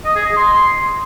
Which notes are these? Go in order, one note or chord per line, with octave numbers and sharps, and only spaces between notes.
D#5
G#4
D#5
C6